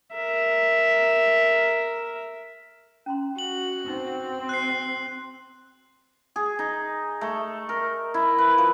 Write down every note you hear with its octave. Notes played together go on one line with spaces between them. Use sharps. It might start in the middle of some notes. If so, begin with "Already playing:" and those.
A#4 E5
C#4 A#5 C6
F#4 F#7
C4 D#4 B4
C6 F#6 C7
G#4
D#4
A3
A#4
E4
B4
F3